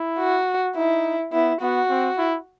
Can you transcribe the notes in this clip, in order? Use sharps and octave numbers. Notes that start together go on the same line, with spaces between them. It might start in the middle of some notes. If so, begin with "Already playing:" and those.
Already playing: E4
F#4
D#4 E4
B3 E4
B3 F#4
C4
E4